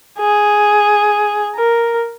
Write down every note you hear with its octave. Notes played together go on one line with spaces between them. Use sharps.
G#4
A#4